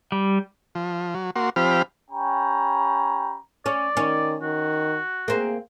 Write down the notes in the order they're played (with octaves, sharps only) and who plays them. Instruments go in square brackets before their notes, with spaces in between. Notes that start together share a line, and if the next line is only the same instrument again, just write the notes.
[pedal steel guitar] G3
[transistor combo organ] F3
F#3
A#3 F#4 C6
F3 C4 G4 B5 F6
[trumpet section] C#4 G4 G5 A#5 B5
[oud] C#4 [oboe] D5
[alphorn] D#3 [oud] C#4
[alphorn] D#3 [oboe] F#4
[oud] A#3 C4 [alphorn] G#4